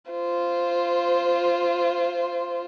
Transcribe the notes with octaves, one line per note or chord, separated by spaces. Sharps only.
F4 C5